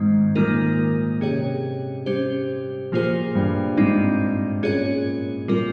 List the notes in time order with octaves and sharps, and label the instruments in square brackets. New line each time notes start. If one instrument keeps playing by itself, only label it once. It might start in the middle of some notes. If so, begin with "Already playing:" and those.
Already playing: [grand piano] G#2 [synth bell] D#3 G#3 C4
[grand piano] A#2 [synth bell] D#3 G3 A#3 D#4 A#4
[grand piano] C3 [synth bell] C#4 G#4 C#5
[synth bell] G3 C#4 G4 C5
[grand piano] A#2 [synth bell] F3 A#3 F4 G#4 C5
[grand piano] G2
[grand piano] G#2 [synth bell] G3 C4 D#4
[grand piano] A#2 [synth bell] C#4 G#4 C#5
[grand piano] A#2 [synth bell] G3 C4 F4 A#4